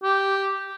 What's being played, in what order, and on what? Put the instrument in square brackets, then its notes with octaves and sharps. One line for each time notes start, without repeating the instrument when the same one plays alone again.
[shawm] G4